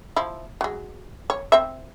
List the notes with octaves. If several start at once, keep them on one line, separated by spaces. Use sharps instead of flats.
F3 E4
F#3 G#3
C#5
C4 E5